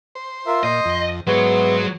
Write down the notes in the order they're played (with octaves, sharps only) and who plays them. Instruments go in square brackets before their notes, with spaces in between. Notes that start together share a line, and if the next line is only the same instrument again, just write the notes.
[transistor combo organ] C5
[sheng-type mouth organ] F4 A#4 E5
[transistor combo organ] A#2 [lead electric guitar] D#5 [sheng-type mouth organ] C6 G6
[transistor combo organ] F2
[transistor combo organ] G#2 C5 [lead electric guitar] F#3 F#4 [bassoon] B3 [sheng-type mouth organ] E5